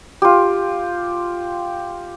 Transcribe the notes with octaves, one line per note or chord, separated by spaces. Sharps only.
F4 G4